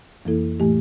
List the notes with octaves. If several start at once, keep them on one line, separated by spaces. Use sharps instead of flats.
F2 E3 A#3 E4 A4
A2 E3 A3 E4 G4